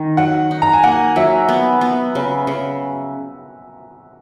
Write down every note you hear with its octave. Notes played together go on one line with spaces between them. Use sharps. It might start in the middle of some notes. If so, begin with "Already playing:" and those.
Already playing: D#3 D#4
F#3 F#5
D#4
A#5
G#5
A#3 F#5
F#3 E5
B3
B3
C#3
C#3